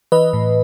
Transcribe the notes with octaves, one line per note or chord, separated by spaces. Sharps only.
E3 B4 D#5
A2